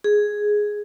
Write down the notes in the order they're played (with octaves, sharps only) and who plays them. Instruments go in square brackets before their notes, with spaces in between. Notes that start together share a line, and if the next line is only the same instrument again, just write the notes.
[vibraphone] G#4